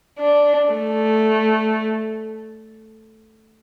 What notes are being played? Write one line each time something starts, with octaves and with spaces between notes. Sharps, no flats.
D4
A3